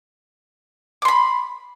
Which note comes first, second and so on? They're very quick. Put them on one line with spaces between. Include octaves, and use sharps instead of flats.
D6 C6 B5